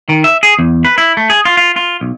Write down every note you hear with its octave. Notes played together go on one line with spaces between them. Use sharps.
D#3
E5
G#4
E2
B4
E4
A3
G#4
F4
F4
F4
B1